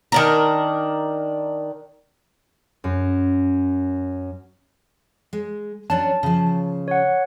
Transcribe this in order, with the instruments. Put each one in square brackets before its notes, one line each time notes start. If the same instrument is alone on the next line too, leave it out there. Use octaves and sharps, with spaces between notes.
[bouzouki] D#3 D4 A#4
[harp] F#2
[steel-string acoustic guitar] G#3
[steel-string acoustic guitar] F#3 C#4 D4 [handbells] A5
[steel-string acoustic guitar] C#3 F3
[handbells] C#5 F#5